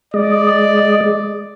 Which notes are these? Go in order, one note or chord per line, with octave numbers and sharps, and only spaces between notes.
G#3 D5 D#5